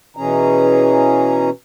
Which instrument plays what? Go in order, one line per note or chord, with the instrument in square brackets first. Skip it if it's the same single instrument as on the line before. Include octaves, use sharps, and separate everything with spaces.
[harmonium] B2 E3 C#4 G#4 A#5